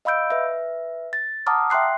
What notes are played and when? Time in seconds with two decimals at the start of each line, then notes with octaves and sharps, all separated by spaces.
0.05 D#5 F5 B5 E6 G6 D7
0.30 B4 E5
1.13 A6
1.46 F#5 A5 A#5 D6 D#6 F6
1.70 E5 G5 C6 F#6 C7